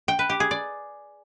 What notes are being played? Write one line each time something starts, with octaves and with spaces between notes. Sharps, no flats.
G5
B4
G4
G#4
D5